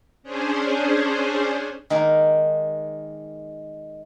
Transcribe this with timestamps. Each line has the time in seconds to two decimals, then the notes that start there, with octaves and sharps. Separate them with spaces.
0.23 C#4 D4 G#4 C5
1.90 D#3 G#3 A#3